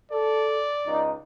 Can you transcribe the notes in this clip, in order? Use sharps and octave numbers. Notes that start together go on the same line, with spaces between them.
A4 D5
C#2 D#4